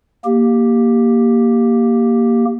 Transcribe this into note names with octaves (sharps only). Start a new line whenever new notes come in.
A#3 G4